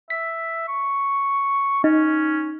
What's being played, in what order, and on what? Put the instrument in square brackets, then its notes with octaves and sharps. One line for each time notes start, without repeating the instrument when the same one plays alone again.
[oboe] E5 [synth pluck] B6
[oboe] C#6
[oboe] C#4 [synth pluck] D#4